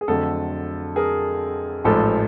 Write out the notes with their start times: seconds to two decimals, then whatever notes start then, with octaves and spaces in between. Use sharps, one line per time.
0.01 G#4
0.08 F2 D3 F#3 A3 A4
0.96 G#4 A#4
1.84 A1 G#2 F3 A4